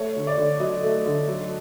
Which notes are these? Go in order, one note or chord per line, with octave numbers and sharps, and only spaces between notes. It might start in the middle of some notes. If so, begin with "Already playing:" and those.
Already playing: A3 C#5
D3
D5
D3
F#3 D#5
A3
D3
F#3